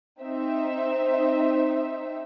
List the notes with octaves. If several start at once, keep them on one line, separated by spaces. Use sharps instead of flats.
C4 D#4 E5